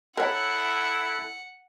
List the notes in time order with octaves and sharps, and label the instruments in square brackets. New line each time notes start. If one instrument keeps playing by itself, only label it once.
[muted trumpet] E4 [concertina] A4 F#6 [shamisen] A#4 C#5 [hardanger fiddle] F#5